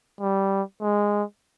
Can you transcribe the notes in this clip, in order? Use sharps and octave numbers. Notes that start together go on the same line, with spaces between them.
G3
G#3